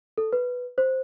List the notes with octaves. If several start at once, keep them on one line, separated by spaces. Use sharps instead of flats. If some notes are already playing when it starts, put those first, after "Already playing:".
A4
B4
C5